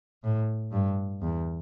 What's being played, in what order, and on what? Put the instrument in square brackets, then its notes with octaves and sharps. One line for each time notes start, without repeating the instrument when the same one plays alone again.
[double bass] A2
G2
E2